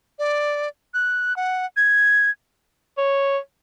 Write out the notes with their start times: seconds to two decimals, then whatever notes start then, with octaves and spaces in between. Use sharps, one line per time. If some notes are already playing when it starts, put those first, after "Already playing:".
0.19 D5
0.94 F#6
1.36 F#5
1.77 G#6
2.98 C#5